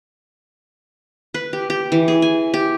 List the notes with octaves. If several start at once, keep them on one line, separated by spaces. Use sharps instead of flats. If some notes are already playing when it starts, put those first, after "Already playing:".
B4
G4
G4
E3
G#4
G#5
G4